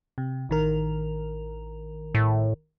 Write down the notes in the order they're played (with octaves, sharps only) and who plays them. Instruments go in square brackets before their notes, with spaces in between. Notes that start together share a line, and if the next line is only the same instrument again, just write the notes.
[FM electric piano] C3
A1 D#3 A#4
[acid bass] A2